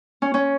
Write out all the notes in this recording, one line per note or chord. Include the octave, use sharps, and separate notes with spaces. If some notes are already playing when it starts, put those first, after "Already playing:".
C#4
C#4